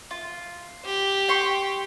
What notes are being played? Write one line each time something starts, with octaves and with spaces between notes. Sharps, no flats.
F4
G4
G5 C6 C#6